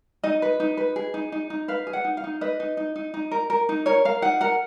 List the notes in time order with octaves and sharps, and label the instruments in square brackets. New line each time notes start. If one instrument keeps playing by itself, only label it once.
[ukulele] D#4 D#5
B4
D#4
B4
G#4
D#4
D#4
D#4
B4 F5
G#4
F#5
D#4
F5
D#4
B4 D#5
D#4
D#4
D#4
D#4
A#4
A#4
D#4
A#4 C#5
A#4 F5
D#4 F#5
A#4 F#5